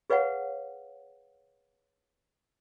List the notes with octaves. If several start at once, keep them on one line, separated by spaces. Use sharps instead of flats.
G#4 B4 C#5 F5 F#5